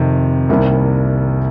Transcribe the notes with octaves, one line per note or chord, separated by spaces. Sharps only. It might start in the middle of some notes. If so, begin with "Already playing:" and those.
Already playing: F2 C3 D#3
C2 C3 D#3 G3 A#3